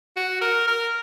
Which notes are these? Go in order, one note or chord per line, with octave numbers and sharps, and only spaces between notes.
F#4
A#4
A#4